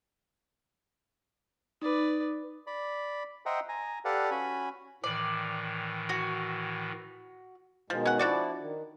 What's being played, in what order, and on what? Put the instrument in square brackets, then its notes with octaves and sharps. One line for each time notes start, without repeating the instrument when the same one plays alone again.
[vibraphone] D#4 [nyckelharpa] B4 D5
[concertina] D5 B5
C5 D#5 E5 F#5 G5 A#5
G#5 A#5
G4 A4 B4 D5 F5 F#5
C#4 F#4 G#5 B5
[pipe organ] A2 D#3 E3 [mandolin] D5
[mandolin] F#4
[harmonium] B2 D#3 G#3 [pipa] F3
[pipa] C#4 F#5
[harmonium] F3 E4 [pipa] D4 F#4 D5
[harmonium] D#3